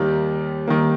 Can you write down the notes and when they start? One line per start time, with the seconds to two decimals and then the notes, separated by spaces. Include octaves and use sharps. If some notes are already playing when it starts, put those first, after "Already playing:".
Already playing: D#2 D#3 G3 A#3 G4
0.67 D#3 G3 A#3